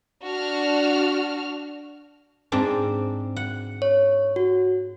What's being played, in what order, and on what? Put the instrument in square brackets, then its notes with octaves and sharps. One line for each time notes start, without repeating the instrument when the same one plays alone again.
[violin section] D4 F#4 F6
[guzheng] G#2 C4 D4
F#5
[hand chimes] C#5
F#4